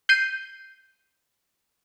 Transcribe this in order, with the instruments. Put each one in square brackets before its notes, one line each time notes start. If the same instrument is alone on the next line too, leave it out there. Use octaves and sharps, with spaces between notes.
[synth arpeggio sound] G6 C7 D#7